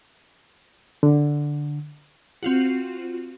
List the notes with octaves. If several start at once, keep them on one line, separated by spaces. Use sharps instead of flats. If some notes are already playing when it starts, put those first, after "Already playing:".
D3
C4 F4 F#4